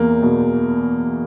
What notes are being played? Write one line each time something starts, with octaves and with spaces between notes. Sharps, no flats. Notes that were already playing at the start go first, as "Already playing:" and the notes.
Already playing: E2 A#3
B2